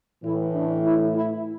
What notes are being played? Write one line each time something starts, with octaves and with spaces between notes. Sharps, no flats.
A2 E3 E4
D4
E4
E4